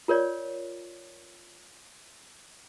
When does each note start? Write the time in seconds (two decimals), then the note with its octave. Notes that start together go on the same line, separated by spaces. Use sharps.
0.08 F4 A#4 C#5 D5